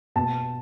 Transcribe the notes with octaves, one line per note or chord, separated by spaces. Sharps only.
B2 A5